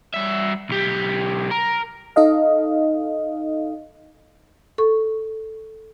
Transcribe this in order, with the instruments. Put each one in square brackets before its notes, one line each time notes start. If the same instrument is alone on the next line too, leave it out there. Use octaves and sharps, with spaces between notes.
[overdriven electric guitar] G2 E5
B1 G4
A#4
[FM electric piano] D#4 A4 D#5 F5
[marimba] A4 C#6